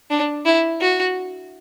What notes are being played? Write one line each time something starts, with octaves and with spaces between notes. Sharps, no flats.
D4
E4
F#4